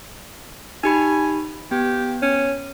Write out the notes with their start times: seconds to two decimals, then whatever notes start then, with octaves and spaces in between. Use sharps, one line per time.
0.84 D#4 G4 G#5 B5
1.71 B3 G4
2.22 C#4